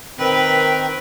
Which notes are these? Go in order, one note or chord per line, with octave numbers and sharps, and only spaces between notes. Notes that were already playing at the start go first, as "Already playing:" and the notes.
D#3 C4 A#4 B4